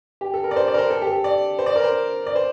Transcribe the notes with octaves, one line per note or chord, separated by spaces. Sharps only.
G4
A4
A#4
D5
C5
D5
A#4
C5
A4
G4
A4
D5
C5
D5
A#4
C5
D5
C5